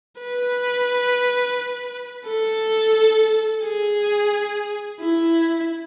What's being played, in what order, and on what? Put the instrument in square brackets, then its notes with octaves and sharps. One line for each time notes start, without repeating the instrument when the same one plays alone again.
[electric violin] B4
A4
G#4
E4